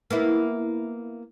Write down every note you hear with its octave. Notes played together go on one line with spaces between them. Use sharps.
A#3 B3 E4